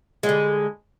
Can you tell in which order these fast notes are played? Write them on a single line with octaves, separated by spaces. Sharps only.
G#3 G3 D3